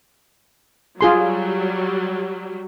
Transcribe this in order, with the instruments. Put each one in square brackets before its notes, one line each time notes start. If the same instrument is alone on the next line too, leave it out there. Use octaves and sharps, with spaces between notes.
[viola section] F#3 G3 [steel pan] F4 G#4 C6